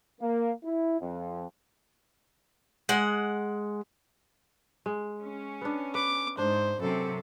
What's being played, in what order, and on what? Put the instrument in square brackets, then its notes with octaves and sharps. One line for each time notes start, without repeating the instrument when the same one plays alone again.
[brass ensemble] A#3
E4
F2
[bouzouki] G#3 F#5
[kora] G#3
[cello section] C#4
[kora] B3 D4
[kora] B4 [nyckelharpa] D6
[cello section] G#2 [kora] D4 [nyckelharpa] C5
[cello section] F#2 C3 [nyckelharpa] A4